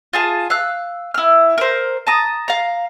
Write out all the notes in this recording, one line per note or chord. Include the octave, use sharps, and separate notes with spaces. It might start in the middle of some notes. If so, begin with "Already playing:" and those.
F4 G#4 A5
F5 E6 F#6
E4 F6
A#4 C5
A5 A#5 D#6
F5 A#5